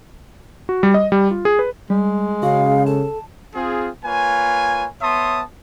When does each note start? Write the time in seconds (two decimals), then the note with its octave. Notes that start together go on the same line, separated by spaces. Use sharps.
0.69 F#4
0.83 G3
0.94 D#5
1.12 G3
1.31 F4
1.45 G#4
1.59 B4
1.90 G3 G#3
2.43 C#3 F#4 F5
2.87 A4 A5
3.55 C4 F4 G#4
4.04 A#3 F4 B4 C#5 G#5
5.01 B3 C#5 E5 A5 C6 D#6